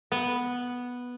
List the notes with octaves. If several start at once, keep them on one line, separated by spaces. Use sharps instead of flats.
B3